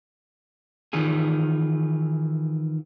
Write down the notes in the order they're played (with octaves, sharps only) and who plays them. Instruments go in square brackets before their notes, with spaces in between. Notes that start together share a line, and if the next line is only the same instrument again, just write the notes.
[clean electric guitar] D#3 E3 F4 G#4